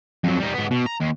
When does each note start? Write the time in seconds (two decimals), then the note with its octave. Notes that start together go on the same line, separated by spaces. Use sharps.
0.24 F2 F#3
0.40 G3 D#4
0.54 G#2 B3
0.71 B2
0.86 A#5
1.00 D#2